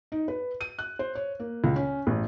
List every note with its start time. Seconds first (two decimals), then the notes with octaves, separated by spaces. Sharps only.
0.12 D#4
0.28 B4
0.61 D#7
0.79 F#6
0.99 C5
1.15 C#5
1.40 A#3
1.64 C#2
1.76 C#4
2.07 A1